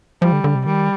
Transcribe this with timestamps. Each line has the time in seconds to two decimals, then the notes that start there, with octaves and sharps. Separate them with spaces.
0.22 F3 G3
0.32 D3
0.44 D3
0.55 C3
0.66 D#3 G3